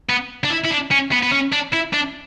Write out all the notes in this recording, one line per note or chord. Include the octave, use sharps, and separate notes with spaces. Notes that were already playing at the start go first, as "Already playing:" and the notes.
B3
D4
E4
E4
D4
C#4
B3
B3
C#4
D4
E4
D4